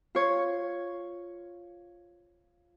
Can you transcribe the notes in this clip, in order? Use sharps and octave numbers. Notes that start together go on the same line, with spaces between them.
F4 C#5